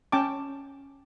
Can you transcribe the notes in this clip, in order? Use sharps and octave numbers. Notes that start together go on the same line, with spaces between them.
C#4 G5 A5 D6